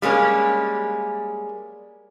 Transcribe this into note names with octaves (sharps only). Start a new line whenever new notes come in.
G3 G#3 A#3 C#4